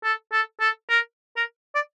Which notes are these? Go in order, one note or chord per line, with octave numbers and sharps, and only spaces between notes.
A4
A4
A4
A#4
A#4
D5